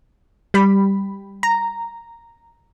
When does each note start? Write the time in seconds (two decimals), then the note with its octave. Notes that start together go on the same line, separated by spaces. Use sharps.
0.54 G3 B5
1.43 A#5